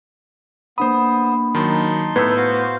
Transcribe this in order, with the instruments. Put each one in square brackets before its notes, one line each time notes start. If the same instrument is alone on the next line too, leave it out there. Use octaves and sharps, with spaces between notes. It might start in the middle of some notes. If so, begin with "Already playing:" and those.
[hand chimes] A#3 D4 B5 [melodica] B3 [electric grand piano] C5 D#6
[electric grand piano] D#3 F#3 [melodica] D#4 A5 C6
[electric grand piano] A2 [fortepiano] B3 [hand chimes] E6 G6 G#6
[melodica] F#4 C5 F5